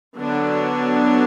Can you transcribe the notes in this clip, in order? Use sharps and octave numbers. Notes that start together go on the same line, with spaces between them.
D3 F#3 B3 D4